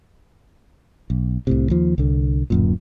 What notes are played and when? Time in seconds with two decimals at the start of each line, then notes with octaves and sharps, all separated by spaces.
1.10 B1
1.47 C2 A2 C3
1.70 D#2 F3
1.98 C2 D3
2.50 D1 F#2 A#2